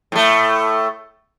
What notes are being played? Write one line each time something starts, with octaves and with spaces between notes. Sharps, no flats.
A2 A3